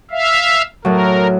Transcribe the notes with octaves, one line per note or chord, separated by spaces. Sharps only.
E5 F5
A2 F#3 A#4